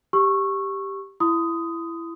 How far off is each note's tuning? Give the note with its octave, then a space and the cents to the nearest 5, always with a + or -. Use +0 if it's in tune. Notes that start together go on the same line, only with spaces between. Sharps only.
G4 +0 C#6 -10 E6 +20
E4 +15 C6 -45 D#6 +5